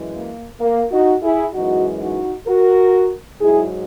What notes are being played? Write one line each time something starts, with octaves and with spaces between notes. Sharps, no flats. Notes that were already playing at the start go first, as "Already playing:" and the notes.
Already playing: F#2 E3 G#3
A#3
A#3
D#4 F#4
E4 G#4
F#2 E3 G#3 D#4 F#4
D#4 F#4
F#4 A#4
G#2 F#3 E4 G#4